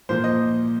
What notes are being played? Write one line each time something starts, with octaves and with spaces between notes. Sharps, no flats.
A#2 F3 A#3 C5
D#5